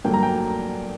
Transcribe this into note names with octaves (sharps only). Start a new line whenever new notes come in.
G2 D3 F#3 A#3 G5
A#5
G5